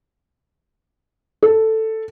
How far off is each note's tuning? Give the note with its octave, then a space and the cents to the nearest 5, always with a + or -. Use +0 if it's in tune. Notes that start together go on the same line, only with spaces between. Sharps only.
A4 +5